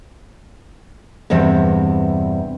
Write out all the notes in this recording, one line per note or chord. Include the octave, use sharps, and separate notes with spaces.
E2 G2 C3 C4